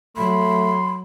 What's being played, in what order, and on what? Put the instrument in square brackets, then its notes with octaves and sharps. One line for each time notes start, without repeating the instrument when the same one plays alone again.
[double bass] F#3 [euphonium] A3 [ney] B5 [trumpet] C6